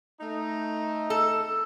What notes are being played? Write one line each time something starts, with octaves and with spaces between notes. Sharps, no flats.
A3 D#4
A4